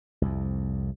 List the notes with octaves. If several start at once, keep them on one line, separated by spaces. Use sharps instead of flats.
C2 F2